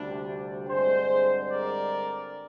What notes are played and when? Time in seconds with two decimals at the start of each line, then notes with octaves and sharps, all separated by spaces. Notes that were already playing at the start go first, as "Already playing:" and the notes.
Already playing: D2 C3 G3 D4
0.68 G2 D3 G#3 C4 G#4 C5
1.50 A#4 D5